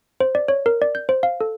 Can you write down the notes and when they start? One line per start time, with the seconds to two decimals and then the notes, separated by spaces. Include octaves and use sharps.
0.20 C5
0.35 D5
0.48 C#5
0.66 A#4
0.82 D5
0.95 G6
1.09 C5
1.23 F5
1.41 A4